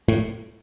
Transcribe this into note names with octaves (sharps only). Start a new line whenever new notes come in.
A2